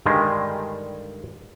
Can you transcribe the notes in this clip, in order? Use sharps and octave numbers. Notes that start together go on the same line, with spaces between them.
G2 D3 D#3 G3 G#3 D4